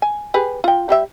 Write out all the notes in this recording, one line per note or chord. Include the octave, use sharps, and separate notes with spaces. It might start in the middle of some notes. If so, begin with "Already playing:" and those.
G#5
G4 G#4 B4
F4 G5
G3 G4 E5